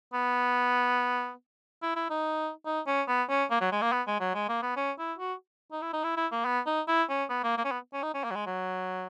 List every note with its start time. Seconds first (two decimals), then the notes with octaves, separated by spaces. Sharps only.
0.14 B3
1.82 E4
1.96 E4
2.10 D#4
2.66 D#4
2.87 C#4
3.08 B3
3.29 C#4
3.51 A#3
3.61 F#3
3.72 G#3
3.82 A#3
3.92 B3
4.07 G#3
4.20 F#3
4.35 G#3
4.49 A#3
4.62 B3
4.77 C#4
4.99 E4
5.19 F#4
5.72 D#4
5.82 E4
5.93 D#4
6.04 E4
6.17 E4
6.32 A#3
6.45 B3
6.66 D#4
6.88 E4
7.09 C#4
7.30 B3
7.44 A#3
7.58 A#3
7.65 C#4
7.71 B3
7.93 C#4
8.03 D#4
8.14 C#4
8.24 A#3
8.31 F#3
8.35 G#3
8.46 F#3